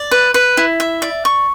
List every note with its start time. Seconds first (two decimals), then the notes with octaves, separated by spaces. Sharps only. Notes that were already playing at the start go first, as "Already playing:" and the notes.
Already playing: D5
0.11 B4
0.34 B4
0.57 E4
0.80 E5
1.02 D5
1.25 C#6